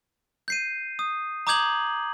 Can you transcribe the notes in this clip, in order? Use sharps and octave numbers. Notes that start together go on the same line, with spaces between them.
G6 C7 D#7
D#6
A#5 D6 D#6 G6 G#6 F#7